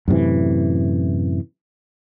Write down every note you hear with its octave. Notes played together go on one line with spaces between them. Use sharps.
F#2 A2 C3 E3